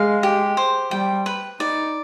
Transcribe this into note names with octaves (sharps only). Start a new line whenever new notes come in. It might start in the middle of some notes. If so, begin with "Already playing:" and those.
Already playing: G#3 F5
G4
C5
G3 G5
B4
D#4 D5